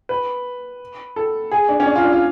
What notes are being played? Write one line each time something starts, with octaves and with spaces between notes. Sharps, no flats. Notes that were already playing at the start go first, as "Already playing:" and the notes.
B4
A4
G#4
D4
C#4
D4
F4
D4
F4